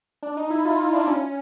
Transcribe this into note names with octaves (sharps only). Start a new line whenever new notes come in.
D4
D#4
E4
F4
D4
C#4